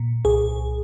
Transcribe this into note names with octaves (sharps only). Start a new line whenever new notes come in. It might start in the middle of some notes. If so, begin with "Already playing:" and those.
Already playing: A#2
C2 G#4